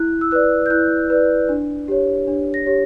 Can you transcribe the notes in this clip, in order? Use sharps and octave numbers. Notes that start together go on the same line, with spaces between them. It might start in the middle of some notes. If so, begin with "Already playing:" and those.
Already playing: E4 F#6
E6
B4 D5 F#6
G6
E4 F#6
B4 D5
D4
G4 C#5
D4
A#6
G4 C#5